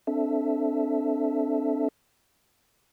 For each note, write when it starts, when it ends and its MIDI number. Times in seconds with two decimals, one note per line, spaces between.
0.07 1.88 60
0.07 1.88 62
0.07 1.88 69
0.07 1.88 76